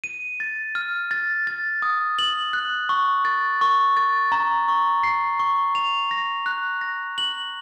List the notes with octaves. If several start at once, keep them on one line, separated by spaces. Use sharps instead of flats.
D#7
A6
F6
A6
A6
D#6
F#7
F#6
C#6
A6
C#6
A6
A#5
C#6
C7
C#6
F7
A#6
F#6
A#6
F#7